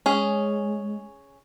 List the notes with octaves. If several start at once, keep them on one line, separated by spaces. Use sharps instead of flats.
G#3 C#4 G#4